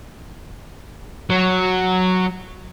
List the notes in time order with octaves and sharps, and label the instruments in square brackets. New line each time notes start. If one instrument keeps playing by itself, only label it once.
[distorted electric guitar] F#3